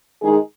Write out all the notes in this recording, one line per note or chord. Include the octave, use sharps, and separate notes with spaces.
D#3 G#3 D#4 G#4